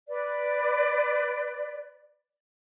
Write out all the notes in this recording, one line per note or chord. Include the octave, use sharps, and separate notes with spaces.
B4 D5